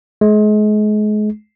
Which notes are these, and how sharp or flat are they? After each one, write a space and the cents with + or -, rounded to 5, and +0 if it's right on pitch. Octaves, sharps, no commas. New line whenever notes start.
G#3 +35